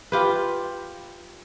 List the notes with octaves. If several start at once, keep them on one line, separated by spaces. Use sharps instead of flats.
F4 G4 B4